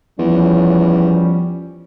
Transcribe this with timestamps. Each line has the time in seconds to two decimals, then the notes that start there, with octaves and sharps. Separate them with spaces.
0.19 E2 F3 G3 C#4